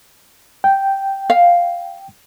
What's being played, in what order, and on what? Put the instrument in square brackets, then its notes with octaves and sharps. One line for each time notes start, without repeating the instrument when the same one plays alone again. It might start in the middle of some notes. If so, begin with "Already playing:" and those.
[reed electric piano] G5
[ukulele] F5